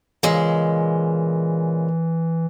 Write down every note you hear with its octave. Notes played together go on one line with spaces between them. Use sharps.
A#2 C#3 E3 G#3